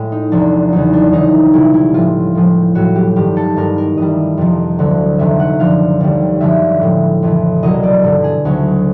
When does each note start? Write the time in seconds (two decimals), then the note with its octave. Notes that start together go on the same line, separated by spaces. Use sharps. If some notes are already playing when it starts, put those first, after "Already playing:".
Already playing: A2 G#3
0.12 D#4
0.32 E2 C3 F3 G#3 D4
0.72 E2 C#3 F#3 D#4
0.93 D4
1.12 D2 C#3 E3 D#4
1.53 C#2 B2 G3 E4
1.74 E4
1.94 A2 F3 G#3 F4
2.35 A2 F3 G#3
2.75 A2 F#3 F#4
2.95 G4
3.16 G2 D#3 G#3 G4
3.37 A4
3.57 G2 D#3 G#3 A#4
3.78 A#4
3.97 G2 E3 G3 D#5
4.37 F2 C3 F3
4.79 D2 D3 F#3
5.19 F2 C3 D#3 G#3 E5
5.39 F#5
5.60 F#2 D3 F3 F5
6.01 D#2 D3 G3
6.41 F#2 D3 F3 G#3 E5
6.81 A2 F3 G#3
7.23 F2 C#3 E3
7.63 C2 B2 F#3 D#5
7.83 D5
8.03 G2 D3 F#3 A4
8.24 G#4
8.45 D2 C#3 F#3